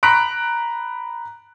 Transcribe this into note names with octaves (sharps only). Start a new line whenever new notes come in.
A#5 B5 F#6 B6 D7